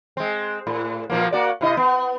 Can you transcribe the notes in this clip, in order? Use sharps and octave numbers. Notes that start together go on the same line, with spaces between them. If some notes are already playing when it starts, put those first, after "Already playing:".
G#3 C4
A2
A#2 F3 A#3
A#3 F#4 D5
C3 E4 D#5
B3